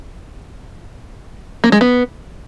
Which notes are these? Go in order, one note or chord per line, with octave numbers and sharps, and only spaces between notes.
A#3
G#3
B3